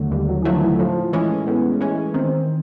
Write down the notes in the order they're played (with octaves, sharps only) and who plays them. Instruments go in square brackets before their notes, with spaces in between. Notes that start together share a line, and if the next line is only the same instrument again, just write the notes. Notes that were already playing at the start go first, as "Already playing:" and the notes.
Already playing: [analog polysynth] D#2 D3 F#3 A3
[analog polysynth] D#2 [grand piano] G3
[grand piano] F#3
E3
[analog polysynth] D3 F#3 A3 [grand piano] F3
[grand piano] D#3
E3
[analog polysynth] A2 [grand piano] F3
[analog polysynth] E3 G#3 C#4
[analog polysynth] A2 [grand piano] B3
[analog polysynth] E3 G#3 C#4
[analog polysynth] D#3 [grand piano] C4